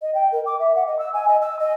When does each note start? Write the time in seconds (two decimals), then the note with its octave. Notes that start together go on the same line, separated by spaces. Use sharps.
0.02 D#5
0.15 G5
0.32 A#4
0.46 D6
0.60 E5
0.76 F#5
0.87 D#5
0.99 E6
1.14 G#5
1.28 D#5
1.42 E6
1.59 D#5